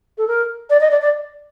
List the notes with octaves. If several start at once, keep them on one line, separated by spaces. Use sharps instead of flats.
A4
A#4
D5
D#5
D5
D5